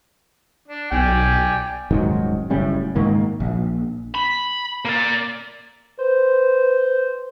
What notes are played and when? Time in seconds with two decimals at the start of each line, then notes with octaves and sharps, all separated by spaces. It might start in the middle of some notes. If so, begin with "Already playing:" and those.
0.68 D4
0.92 B1 D5 G5 G#5
1.91 D#1 G#2 D#3 F#3
2.50 F#1 A2 G3 C#4
2.95 G#2 D#3 G#3 A#3
3.40 A#1
4.15 B5
4.85 A#3 D5
5.99 B4 C5